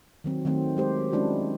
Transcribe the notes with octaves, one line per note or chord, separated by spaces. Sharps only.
D#3 F#3 C4
D#3 F#3 A3 C4
G#3 G4 C5
G#3 C#4 D4 E4 F#4